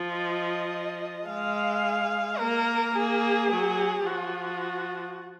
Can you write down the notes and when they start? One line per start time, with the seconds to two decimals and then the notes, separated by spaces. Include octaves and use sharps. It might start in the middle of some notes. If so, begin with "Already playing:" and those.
Already playing: F3
0.16 D#5
1.27 G#3 F5
2.39 A#3 A#4
2.95 A#3 G#4
3.51 F#3
4.06 F3 F#4